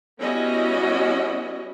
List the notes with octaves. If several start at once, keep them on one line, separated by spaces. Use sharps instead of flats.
G3 B3 C#4 E4 F#4 D#5